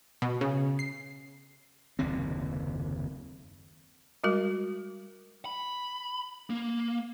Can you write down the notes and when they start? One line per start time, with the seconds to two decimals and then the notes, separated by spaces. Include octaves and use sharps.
0.22 B2
0.41 C#3
0.79 C7
1.99 F#1 D#2 C3 C4
4.24 G3 G#3 F#4 A#4
5.45 B5
6.50 A#3